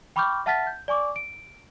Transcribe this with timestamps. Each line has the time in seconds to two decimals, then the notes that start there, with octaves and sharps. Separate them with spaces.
0.16 G5 B5 C#6 D6 F6 G6
0.46 E5 F#5 A5 F6 A6 B6
0.67 G6
0.88 D5 G#5 C#6 D6
1.16 D7